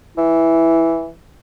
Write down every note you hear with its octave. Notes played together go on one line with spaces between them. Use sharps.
E3 E4